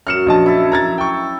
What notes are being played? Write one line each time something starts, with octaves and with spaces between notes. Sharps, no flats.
F#2 F6 C#7 E7
A#1 D#5 A5
E4 A4
A#5 G#6 A6
G5 C#6